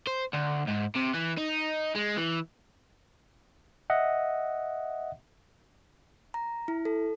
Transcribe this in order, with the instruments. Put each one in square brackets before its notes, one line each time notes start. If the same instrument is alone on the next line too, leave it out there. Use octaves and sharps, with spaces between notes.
[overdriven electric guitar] C5
D2
G#2
C3
E3
D#4
G#3
E3
[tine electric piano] D#5 E5 F#5
[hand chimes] A#5
E4
A4